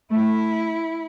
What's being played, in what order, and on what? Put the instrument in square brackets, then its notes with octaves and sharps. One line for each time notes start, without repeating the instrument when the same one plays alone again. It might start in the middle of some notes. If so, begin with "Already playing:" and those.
[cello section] A3 [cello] E4